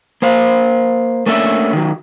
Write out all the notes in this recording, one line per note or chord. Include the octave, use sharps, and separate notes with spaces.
A#3 C5 F5
A3 A#3 C#4 D4 E4 E5
D#3 F#3